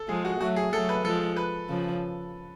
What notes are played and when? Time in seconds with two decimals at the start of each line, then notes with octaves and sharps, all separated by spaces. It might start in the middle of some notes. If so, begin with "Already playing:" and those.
Already playing: A4
0.08 F3 G#3 G#4
0.25 F#4
0.40 F#3 A3 F#4
0.56 G#4
0.72 F#3 A3 A4
0.89 B4
1.04 F3 G#3 A4
1.36 B4
1.69 C#3 F3